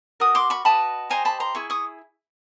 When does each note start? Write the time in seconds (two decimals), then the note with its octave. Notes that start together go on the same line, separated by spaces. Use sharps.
0.20 F#4 A#4 D#6
0.35 C6 D6
0.50 B5 C#6
0.65 F#4 B4 D#5 A5 B5
1.10 G4 C5 D#5 G#5 A#5
1.25 A5 B5
1.40 A#5 C6
1.55 E4 G#4 C#6
1.70 C#6 D#6